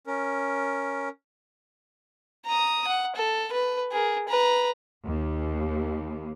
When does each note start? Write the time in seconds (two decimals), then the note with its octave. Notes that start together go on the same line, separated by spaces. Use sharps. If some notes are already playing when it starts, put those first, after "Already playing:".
0.07 C#4 A#4
2.46 A#5 D#6
2.88 F#5
3.16 A4
3.53 B4
3.92 G#4 A#4
4.28 B4 A#5
5.06 D#2